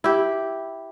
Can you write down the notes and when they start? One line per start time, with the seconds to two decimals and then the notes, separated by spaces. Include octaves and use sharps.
0.04 E4 G4